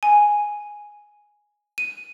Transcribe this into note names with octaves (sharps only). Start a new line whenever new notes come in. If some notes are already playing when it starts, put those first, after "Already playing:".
G#5
D#7